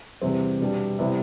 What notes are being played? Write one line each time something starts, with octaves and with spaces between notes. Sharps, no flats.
E2 C3 G3 C4
B2 G3 D4
C3 G3 B3 E4